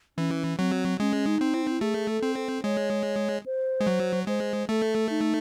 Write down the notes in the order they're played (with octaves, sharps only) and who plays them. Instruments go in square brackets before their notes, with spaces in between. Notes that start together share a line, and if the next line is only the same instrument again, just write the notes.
[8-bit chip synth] E3 [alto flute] C#4
[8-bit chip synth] F#3 [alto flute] C4
[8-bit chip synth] G#3 [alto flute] C#4
[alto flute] D#4
[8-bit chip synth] C4
[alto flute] E4
D#4
E4
[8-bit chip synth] A3 [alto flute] G#4
[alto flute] A4
[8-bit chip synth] C4
[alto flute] A4
[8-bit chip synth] G#3 [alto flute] C#5
[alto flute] C5
[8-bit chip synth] G#3
F#3
[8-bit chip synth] G#3 [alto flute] C5
[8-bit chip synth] A3 [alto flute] A4
[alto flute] D#4